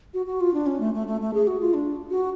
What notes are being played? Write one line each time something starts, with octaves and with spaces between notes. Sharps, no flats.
F#4
F#4
F4
D4
C#4
A3
A3
A3
A3
G#4
F#4
F4
D4
F#4